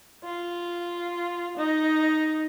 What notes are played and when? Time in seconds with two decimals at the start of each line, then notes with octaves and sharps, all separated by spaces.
0.24 F4
1.57 D#4